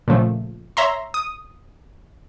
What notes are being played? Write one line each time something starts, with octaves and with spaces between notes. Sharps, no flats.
A#2 C#3 F3 A3
C#5 E5 A#5 C6
D#6